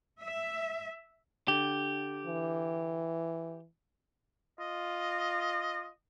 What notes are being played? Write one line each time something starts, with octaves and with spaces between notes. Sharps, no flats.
E5
D3 G4
E3
F4 D#5